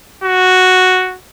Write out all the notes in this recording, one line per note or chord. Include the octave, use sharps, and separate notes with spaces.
F#4